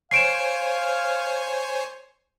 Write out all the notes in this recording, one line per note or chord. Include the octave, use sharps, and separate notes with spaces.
C5 C#5 F5 G#5 C7 D7 E7